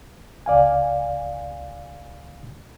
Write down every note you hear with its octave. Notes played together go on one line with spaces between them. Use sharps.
C#2 D5 F5 G#5